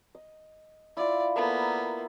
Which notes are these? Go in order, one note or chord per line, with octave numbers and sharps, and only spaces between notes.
D#5
E4 F4 D5
A#3 B3 A4 A#4 C5